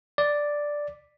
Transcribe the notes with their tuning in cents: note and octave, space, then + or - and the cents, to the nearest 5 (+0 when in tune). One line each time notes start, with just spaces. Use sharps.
D5 +0